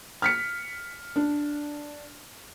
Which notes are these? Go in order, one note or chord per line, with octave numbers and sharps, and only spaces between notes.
F6 B6 C#7
D4